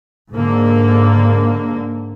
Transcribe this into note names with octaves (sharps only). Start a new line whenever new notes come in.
G#2 D3 A#3